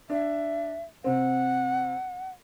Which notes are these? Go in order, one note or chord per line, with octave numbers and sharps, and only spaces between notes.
D4 E5
C3 C4 F#5